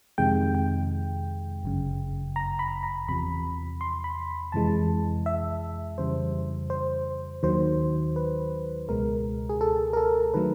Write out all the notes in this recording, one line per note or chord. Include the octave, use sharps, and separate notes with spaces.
F2 C3 D#3 G#3 G5
G5
G1 F#2 C#3
A#5
B5
A#5
E2 C3 F3 B5
C6
B5
F2 C3 E3 G#3 A5
E5
F2 C#3 E3 G3 C5
C5
D#2 D#3 F#3 C5
B4
C#2 B2 G#3 A#4
G#4
A4
A#4
A4
D#3 F#3 A3 B4